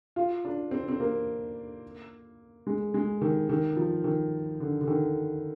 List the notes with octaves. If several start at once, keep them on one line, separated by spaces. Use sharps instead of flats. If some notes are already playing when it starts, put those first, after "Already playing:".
F4
D4
C4
C4
A#3
G#3
G#3
D#3
D#3
F3
D#3
D3
D3
D#3